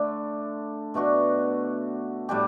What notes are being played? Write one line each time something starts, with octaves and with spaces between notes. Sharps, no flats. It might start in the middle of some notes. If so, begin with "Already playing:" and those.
Already playing: D3 A3 D4
B2 A3 D4 F#4
A2 G3 D4 G4